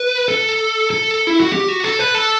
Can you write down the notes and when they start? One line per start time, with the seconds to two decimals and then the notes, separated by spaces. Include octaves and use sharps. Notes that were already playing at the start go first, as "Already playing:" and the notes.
Already playing: B4
0.28 A4
0.91 A4
1.27 E4
1.40 F#4
1.52 G4
1.68 F#4
1.84 A4
1.99 B4
2.15 A4